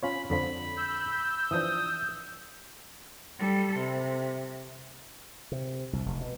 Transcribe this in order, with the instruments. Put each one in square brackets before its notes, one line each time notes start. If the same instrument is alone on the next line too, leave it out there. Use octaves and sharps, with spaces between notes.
[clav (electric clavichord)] C#4 F4 C#5 [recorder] B5
[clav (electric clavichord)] F2 D3 F3 [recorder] B5
[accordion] E6 G6
[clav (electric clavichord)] E3 F3 D4 [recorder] D#6
[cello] G3 A4
C3
[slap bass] C3
C2
F1
B2